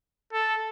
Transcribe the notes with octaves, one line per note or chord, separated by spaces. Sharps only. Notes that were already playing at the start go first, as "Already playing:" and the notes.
A4